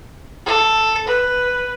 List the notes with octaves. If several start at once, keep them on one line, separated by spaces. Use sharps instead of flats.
A4
B4